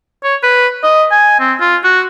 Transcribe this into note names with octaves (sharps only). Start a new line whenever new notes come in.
C#5
B4
D#5
G#5
C4
F4
F#4